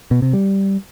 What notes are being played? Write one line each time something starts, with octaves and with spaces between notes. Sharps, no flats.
B2
C3
G3